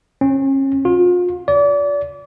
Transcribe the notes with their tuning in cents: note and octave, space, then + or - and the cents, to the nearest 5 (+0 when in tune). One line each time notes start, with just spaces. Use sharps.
C#4 -35
F4 +35
D5 -35